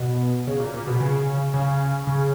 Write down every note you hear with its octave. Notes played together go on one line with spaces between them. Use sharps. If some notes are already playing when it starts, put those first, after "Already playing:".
Already playing: B2
C#3
A#2
A#2
B2
C#3
C#3
C#3